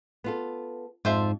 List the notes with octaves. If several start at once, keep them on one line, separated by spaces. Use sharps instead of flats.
B3 F4 A4
F2 G#2 F4 C5 E5 G5 A5